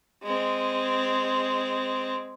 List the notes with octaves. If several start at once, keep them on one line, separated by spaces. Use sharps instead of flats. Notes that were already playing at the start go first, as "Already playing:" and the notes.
G#3 C4